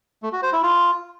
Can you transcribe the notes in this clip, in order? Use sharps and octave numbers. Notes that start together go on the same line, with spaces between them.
A3
F#4
C5
E4
F4